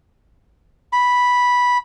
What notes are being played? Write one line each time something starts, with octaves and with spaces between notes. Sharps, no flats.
B5